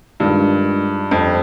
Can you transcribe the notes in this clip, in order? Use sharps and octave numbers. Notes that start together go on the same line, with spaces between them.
G2 D#3 G#3 D4 F4
F2